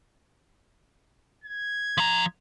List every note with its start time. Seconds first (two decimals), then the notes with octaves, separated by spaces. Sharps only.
1.44 G#6
1.98 F3 A#5